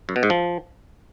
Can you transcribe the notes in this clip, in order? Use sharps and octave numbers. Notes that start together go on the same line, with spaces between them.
F#2
B2
G#2
F3